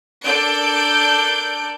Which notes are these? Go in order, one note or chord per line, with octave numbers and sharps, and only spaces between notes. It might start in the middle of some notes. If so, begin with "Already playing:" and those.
D4 A4 A#4 D5 G6 D7